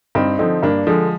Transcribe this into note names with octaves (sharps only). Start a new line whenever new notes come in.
G2 C4 D#4
D3 F3 C4 D#4
G2 A#3 D4
D3 F3 G#3